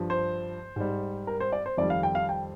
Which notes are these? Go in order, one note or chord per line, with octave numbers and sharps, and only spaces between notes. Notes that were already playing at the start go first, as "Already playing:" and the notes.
Already playing: G2 F3
C5
G#2 G3
A#4
C5
D5
C5
F2 D#3 G3 D5
F5
G5
F5
G5